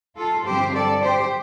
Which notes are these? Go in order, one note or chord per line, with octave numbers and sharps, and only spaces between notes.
F4 A4
G2 D3 F3 C4 G4 C5
A4 D5
G4 C5